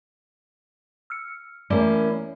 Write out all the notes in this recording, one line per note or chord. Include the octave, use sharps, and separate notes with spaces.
E6 F6 C#7
E3 A3 A#3 C#4 E4 D5